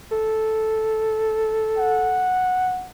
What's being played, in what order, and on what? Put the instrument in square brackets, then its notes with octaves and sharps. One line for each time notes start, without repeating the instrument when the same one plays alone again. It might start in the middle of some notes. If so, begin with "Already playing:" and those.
[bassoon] A4
[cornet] F#5